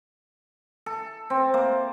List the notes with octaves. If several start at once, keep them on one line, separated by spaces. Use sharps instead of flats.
A4
C4
A#3